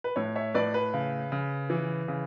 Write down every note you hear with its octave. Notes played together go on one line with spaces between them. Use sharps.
B4
A2 C#5
C#5 E5
A2 B4 D5
B4
C#3
C#3
E3
C#3